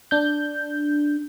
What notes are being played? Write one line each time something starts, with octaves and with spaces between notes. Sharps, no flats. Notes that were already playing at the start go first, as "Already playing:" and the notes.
D4 G6